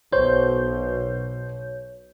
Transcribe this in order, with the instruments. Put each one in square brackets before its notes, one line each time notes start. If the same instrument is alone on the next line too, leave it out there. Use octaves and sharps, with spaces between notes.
[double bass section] B1 B2 [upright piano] C5 [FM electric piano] C#5 G6